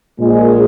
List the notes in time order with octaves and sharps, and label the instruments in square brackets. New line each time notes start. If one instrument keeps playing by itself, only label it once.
[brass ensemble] A#1 A#2 G#3